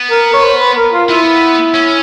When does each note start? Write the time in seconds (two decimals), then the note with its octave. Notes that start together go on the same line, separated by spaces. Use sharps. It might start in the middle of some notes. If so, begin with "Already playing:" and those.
Already playing: B3
0.11 A#4
0.33 C#5
0.43 C5
0.60 B4
0.77 A#4
0.93 F4
1.09 B3 E4
1.74 C#4